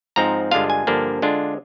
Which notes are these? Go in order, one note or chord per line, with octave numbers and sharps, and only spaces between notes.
G#2 F3 C4 D#4 A#5
G2 D3 G#3 D4 F4 F5
G#5
G2 D3 F3 A#3 D4
D3 G#3 D4 F4